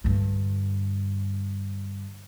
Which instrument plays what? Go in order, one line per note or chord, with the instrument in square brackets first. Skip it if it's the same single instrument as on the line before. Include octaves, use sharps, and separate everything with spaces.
[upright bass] G2 D3